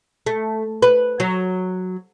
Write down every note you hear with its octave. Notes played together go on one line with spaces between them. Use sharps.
A3
B4
F#3